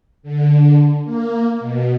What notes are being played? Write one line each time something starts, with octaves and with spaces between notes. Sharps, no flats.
D3
A#3
B2